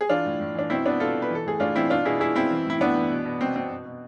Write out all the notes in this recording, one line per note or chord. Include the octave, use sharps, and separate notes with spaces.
G#4
E3 D4 F4
A2
A2
E3 D4
B2 C4 E4
B2 B3 D4
B2 F4 A4
B2
B4
E3 A4
A2 G#4
A2 D4 F4
E3 C4 E4
B2 D4 F4
B2 E4 G#4
B2 E4 G#4
B2 C4 E4
E3
A2 E4
A2 B3 D4
E3
B2
B2
B2 C4
B2 C4
B2
B2